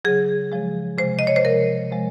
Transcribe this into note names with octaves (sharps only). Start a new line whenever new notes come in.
C#3 F#3 G#4
C#3 F3 G#3
C3 F3 G#3 C5
D#5
C#5
C5
C3 F3 G#3 A#4
C3 F3 G#3